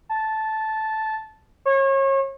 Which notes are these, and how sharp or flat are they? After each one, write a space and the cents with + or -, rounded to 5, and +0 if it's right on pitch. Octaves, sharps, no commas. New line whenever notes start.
A5 -10
C#5 -35